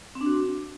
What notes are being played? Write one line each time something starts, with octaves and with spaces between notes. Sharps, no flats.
C4
D4
F#4